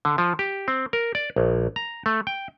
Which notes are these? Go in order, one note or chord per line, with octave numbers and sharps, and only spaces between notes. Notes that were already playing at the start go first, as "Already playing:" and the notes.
D3
F3
G4
C4
A#4
D5
A#1
A#5
A3
G5